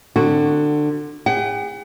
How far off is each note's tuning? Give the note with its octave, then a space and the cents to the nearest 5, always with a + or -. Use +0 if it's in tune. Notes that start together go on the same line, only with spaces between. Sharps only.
D3 +25 C4 +0 F#4 +0
G#4 -45 F#5 +40